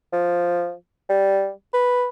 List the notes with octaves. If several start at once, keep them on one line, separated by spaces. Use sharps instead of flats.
F3
G3
B4